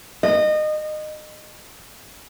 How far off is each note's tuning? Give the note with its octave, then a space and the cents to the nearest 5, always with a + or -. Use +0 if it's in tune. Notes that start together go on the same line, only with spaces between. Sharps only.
D#5 -25